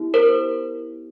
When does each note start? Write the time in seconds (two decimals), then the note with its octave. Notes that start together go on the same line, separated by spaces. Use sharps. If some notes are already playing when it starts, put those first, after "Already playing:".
Already playing: B3 E4 G4
0.14 A#4 C5